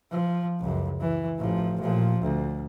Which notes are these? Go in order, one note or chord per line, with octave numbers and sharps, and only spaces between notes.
F3
C#2 F#2
E3
A1 F3
A#2 F3
D2